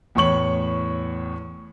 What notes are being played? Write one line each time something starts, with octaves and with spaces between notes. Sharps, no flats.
E2 A2 C#5 C#6 F#7